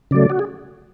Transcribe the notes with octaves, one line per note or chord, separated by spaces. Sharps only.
C#3 F#3 A3 D5
F#4
G#4